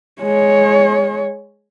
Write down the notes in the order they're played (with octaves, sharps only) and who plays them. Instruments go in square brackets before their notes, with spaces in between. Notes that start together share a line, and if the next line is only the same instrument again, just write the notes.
[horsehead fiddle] G#3 C#5